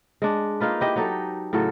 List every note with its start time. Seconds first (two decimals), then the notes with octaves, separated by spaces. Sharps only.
0.22 G#3 D4
0.60 A#3 D#4 F4 B4
0.80 E4 G4 D#5
0.96 F#3 D#4 G4 A4
1.53 A2 C#3 F#3 A4